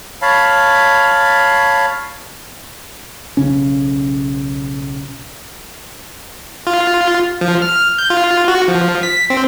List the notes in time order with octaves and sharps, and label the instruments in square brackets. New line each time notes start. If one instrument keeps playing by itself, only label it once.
[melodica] C#5 F5 A5 B5
[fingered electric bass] B1 C#3 C#4
[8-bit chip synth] F4
F3
F6
G6
F4
F#4
F3
B6
C4